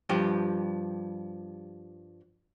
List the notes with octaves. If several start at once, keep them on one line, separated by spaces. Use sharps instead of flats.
G2 F3 G4